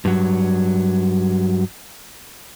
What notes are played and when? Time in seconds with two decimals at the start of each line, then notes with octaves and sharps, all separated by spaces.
0.05 G2 F#3